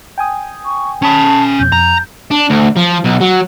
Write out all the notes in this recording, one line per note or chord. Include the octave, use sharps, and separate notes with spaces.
G5 G#5 D#6
C#6
C#4 A5 B5
F2 B2 G6
F2 A#5
D4
D2
F3
B1
F#3